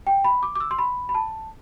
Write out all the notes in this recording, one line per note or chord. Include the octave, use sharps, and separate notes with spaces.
G5
B5
D6
D6
E6
C6
B5
B5
A5